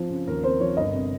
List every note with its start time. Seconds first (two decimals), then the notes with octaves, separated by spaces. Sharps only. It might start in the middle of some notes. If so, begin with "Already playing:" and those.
Already playing: F3 C4
0.10 C#3
0.27 D#2 A#4
0.44 C4 C5
0.60 F3 C#5
0.77 G1 D#5
0.94 C3